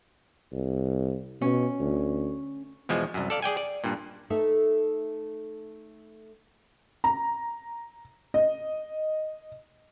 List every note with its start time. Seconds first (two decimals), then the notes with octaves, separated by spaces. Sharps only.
0.52 C2
1.41 B2 C#4
1.80 D2
2.89 E2 B2 F3 G#3
3.14 C2 F#2
3.30 A4 D5 F5
3.42 G#4 D5 G5 G#5
3.57 D5
3.84 G2 A#2
4.30 A3 D#4 A4 E5
7.04 A#5
8.34 D#5